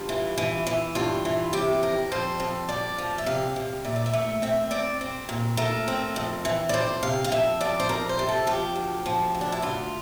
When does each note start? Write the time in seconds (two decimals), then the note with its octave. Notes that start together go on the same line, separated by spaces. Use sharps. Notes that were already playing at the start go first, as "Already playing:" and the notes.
Already playing: G2 F4
0.09 E3
0.38 E3
0.67 E3
0.95 G2 F4
1.25 E3
1.53 C3 G4
1.83 F2 A#4
2.12 F2 C5
2.40 F2
2.69 F2 D5
2.98 F3
3.18 E5
3.26 C3 F5
3.56 C3
3.85 A#2 E5
3.96 D5
4.06 E5
4.13 A3
4.42 C4 E5
4.71 C4 D5
5.01 C4
5.29 A#2
5.57 A3 A#4
5.88 C4
6.16 F2
6.45 E3
6.69 D5
6.74 F2 C5
7.03 C3 F5
7.24 F5
7.32 F2 E5
7.61 F2 D5
7.80 C5
7.89 F2 A#4
8.09 C5
8.19 C3
8.29 A4
8.47 F3 G4
8.76 D2
9.06 F3
9.35 D2
9.41 D4
9.52 E4
9.62 D2 F4